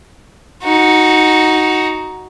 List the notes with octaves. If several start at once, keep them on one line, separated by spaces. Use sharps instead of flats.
D#4 F#4